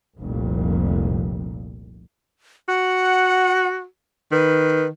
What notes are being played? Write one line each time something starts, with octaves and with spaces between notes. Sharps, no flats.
F1 C2 F2 A#2
F#4 F#5
D#3 B4